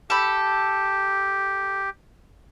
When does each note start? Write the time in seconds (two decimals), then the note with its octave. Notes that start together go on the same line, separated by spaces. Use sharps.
0.10 G4 A4 B5